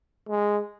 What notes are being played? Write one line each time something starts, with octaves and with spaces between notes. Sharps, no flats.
G#3